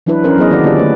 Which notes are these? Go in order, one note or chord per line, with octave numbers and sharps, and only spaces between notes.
E3 F#3 D4 E4 B4
E3 C#4 A#4 C5
F#3 B3 G#4 C5 D#5
D#3 A#3 F#4 G#4 A4 D5
D3 A#3 F4 G4 D5
D#3 A3 B4